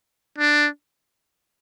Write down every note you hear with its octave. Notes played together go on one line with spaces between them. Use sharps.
D4